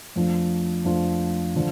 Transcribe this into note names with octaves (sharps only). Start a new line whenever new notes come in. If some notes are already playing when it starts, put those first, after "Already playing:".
F2 F3 A3 D4 F4
F2 F3 A3 D4 F4
D3 F3